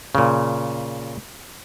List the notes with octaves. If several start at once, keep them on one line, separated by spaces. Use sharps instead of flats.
A#2 C#3